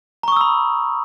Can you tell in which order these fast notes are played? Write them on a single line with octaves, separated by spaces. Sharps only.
A#5 C#6 D#6 E6 B5